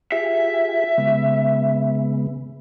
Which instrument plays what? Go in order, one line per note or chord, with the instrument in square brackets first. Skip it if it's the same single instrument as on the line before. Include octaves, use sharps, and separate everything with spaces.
[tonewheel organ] F4 G4 G#4 [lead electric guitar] E5
[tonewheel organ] C#3 G#3 B3